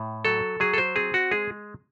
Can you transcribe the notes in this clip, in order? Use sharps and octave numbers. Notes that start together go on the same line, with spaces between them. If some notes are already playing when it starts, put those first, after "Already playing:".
Already playing: A2
F#3 A4
F#3 G#4
A4
C5
C4 G#4
F#4
G#3 G#4